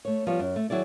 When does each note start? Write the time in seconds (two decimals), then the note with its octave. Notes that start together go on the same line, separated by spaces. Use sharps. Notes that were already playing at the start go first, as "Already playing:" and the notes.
0.05 A3 C#5
0.27 F3 G3 B3 C#5
0.40 F#2
0.56 A3
0.70 D#3 F#3 E4 G#4 D5